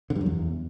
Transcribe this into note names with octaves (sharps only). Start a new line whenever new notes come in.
D3
G2
F#2
E2